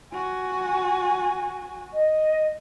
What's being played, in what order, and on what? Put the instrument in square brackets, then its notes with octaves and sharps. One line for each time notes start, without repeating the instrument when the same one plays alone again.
[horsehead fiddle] F#4 G#5
[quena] D#5